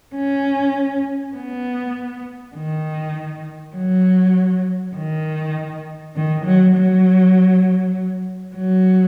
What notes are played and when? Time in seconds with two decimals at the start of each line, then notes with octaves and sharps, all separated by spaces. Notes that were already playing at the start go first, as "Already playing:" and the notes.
0.15 C#4
1.36 B3
2.56 D#3
3.76 F#3
4.96 D#3
6.16 D#3
6.45 F#3
6.76 F#3
8.56 F#3